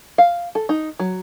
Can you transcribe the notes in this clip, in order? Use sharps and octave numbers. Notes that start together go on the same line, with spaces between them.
F5
A4
D#4
F#3